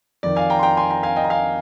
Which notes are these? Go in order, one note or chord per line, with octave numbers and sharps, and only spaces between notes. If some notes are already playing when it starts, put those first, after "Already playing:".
F2 D#3 D5
F5 G#5
G5 A#5
C6
G5 A#5
G#5 C6
G5 A#5
F5 G#5
D#5 G5
A#5
F5 G#5